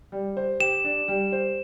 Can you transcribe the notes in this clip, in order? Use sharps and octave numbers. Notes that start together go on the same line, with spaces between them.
G3
C5
G4 E7
D4
G3
C5